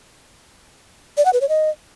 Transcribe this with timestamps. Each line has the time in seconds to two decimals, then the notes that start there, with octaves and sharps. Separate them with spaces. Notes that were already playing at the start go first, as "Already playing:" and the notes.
1.17 D5
1.25 F#5
1.33 B4
1.41 C#5
1.49 D#5